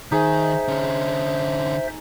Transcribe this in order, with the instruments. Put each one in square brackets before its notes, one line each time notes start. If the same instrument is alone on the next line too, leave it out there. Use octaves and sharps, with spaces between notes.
[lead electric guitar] D#3 [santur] D#4 G#4 [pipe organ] C5 E5
[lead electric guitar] D3 C#4